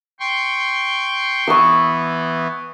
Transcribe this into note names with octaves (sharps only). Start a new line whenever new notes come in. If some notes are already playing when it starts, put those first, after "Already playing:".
G5 C6 C#6
E3 B3 C#6 D#6 E6